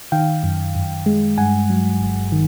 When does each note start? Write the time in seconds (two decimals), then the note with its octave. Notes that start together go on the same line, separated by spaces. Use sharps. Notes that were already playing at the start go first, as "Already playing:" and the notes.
0.12 D#3 F5 G5
0.43 F#2
0.75 F#2
1.06 G#3
1.38 G2 F#5 G#5
1.70 F#3
2.01 G1
2.32 D#3